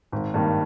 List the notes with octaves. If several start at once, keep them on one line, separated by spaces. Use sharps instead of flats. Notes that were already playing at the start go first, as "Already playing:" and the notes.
G#1
G2 D#3 A#3